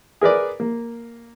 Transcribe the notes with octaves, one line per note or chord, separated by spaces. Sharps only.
G#4 A#4 B4 D5
A#3